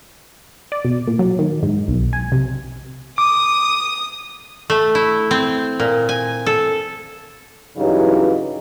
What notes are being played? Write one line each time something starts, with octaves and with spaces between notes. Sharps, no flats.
D5
B2
A#2
F#3
D#3
G#2
B1
G#5
C3
D6 D#6
A3
E4
C4
A#2
G#5
A4
G2 C#3 E3 F#3 D#4 G4